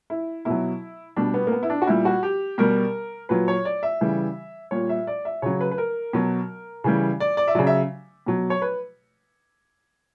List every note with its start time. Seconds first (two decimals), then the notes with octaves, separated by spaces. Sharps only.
0.10 E4
0.45 B2 F#3 E4
1.16 B2 G3 D4
1.34 B3
1.47 A#3
1.52 B3
1.63 E4
1.70 D4
1.82 F#4
1.87 A#2 G3 E4
2.05 F#4
2.23 G4
2.58 B2 G3 A#4
3.29 A#2 F#3 B4
3.48 C#5
3.65 D5
3.83 E5
4.01 C#3 E3 G3
4.71 A#2 G3 C#5
4.89 E5
5.07 D5
5.25 E5
5.42 C#3 F#3 C#5
5.61 B4
5.71 B4
5.78 A#4
6.13 B2 F#3
6.84 C#3 E3 G3
7.20 D5
7.37 D5
7.48 E5
7.55 C#3 F#3 D5
7.67 E5
8.26 B2 F#3
8.50 C#5
8.62 B4